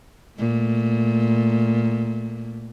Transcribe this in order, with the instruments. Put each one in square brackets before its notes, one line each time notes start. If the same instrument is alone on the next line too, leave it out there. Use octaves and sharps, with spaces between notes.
[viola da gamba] A#2 A3